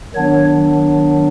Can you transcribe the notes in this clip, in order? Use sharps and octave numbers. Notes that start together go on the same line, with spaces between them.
D#3 F#3 B3 D4 C#5